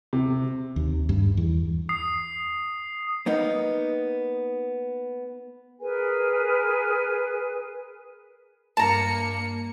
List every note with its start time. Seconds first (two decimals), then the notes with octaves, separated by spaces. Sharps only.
0.13 C3
0.76 D#2
1.09 G2
1.37 E2
1.89 D#6 C7
3.26 A#3 B3 D#4
5.79 G#4 A#4 B4 G#5
8.77 G2 A#3 A5 A#5 C#7